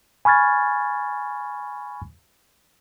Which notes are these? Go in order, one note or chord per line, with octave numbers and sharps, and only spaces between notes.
G#5 B5 C#6 F6 G#6 A6